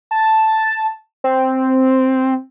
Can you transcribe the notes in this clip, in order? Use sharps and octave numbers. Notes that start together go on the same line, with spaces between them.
A5
C4